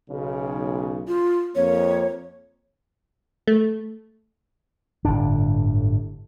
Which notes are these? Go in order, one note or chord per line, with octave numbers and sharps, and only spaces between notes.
B1 C#3
F4
F2 A#3 C#5
A3
G1 A2 D3 D4